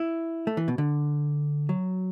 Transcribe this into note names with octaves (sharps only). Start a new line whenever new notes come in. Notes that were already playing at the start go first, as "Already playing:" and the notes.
Already playing: E4
A3
E3
B2
D3
F#3